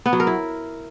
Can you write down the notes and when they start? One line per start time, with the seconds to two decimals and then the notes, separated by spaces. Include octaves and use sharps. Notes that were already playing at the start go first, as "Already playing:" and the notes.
0.06 B3
0.13 F#3
0.20 A#4
0.27 E4